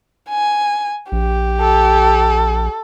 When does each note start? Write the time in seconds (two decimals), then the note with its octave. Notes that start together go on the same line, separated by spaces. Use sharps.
0.30 G#5
1.12 A#1 G4
1.61 A4